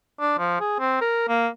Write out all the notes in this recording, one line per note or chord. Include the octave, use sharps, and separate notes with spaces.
D4
F3
G#4
C4
A#4
A#3